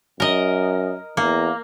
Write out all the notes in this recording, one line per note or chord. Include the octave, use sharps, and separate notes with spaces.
F#2 A#4 D#5
E2 A#3